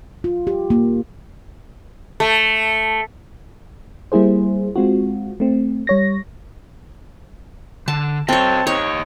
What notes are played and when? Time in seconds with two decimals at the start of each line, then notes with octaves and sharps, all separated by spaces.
0.24 F4
0.47 G4
0.70 A#3
2.20 A3
4.12 G3 A#3 E4 G#4 C5
4.76 G#3 C4 F4 F#4
5.40 A3 C4
5.87 G3 C#5 A#6
7.88 D3 A5
8.28 C4 F#4 A4 C#5 D#5 A5
8.67 D#4 G4 C#5 D#5